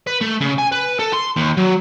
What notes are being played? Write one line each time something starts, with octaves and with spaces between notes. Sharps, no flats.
B4
A3
C#3
G#5
B4
A4
C6
D#2
F#3